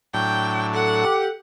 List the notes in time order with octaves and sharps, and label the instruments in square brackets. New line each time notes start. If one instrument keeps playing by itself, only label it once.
[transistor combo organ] A2 F#3 D4 [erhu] G5
[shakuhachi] A4 [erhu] F#5
[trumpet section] G4